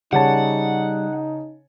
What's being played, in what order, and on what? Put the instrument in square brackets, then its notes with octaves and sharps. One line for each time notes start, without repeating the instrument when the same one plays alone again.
[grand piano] C#3 C#5 A5 [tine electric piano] G3 [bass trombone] D#4 [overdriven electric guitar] F#5